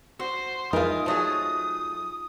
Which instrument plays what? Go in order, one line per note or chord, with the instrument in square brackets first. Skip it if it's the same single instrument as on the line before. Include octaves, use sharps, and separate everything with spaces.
[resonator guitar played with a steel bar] F#4 [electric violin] C5
[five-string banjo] E3 F4 [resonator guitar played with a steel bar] G#3 A#4 [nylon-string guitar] D#4 [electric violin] D#6
[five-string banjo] F3 G#4 [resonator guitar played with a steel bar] F#3 A3